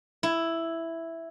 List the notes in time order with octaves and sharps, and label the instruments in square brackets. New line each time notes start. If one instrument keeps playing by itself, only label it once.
[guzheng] E4